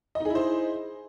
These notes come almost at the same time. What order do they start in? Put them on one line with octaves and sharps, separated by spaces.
D#5 D#4 G#4 E4 C5